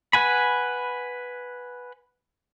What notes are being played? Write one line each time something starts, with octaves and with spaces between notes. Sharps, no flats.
B4 F#5 G#5 B5